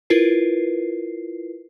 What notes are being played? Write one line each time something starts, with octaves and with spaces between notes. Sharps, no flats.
E4 F4 A#4 B4 C7